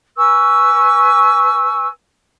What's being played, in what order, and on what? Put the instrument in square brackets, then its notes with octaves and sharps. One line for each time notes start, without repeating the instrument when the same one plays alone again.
[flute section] B4 G#5 C#6 E6